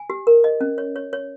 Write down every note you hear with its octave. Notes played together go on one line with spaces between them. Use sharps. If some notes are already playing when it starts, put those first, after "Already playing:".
Already playing: G#5
G4
A#4
D#5
C#4
C#5
C#5
C#5